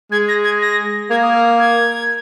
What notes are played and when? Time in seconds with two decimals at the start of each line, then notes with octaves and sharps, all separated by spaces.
0.12 G#3 G#6
0.28 A#6
0.44 G#6
0.62 A#6
1.10 A#3 G#6
1.22 D#6
1.35 F6
1.60 G#6